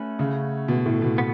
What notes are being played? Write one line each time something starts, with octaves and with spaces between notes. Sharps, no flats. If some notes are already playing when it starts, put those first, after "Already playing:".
Already playing: A3 C#4 F#4 B4
C#3
B2
A2
B2
B3